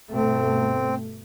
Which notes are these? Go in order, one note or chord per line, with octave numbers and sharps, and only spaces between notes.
G1 B2 A3 C4